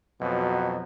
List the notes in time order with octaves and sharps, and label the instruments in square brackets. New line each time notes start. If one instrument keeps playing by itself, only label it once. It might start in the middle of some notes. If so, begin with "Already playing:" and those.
[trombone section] F2 B2 F#3